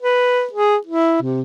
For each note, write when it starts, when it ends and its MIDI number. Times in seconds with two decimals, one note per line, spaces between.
0.02 0.47 71
0.53 0.77 68
0.87 1.19 64
1.23 1.42 48